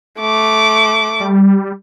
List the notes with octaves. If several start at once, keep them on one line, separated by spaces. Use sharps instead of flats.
A3 D6
G3